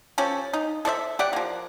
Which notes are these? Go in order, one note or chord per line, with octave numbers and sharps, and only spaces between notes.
F3 C#4 G4 A4
D#4
A4 C5 D5 E5
G4 D5 F#5
F3 A#3